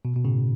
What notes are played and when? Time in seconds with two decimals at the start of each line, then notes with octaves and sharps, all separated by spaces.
0.05 B2
0.16 B2
0.25 A2 C#3